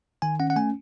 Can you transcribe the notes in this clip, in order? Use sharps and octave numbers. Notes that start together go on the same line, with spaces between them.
D#3 G#5
C#4 F#5
F#5
A3 G#5